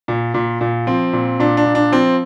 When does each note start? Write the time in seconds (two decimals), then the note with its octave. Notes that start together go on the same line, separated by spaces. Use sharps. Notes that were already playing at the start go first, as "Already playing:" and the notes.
0.08 A#2
0.34 A#2
0.61 A#2
0.87 F3 C4
1.13 A#2
1.40 A#2 D4
1.57 D4
1.66 A#2
1.75 D4
1.92 F3 C4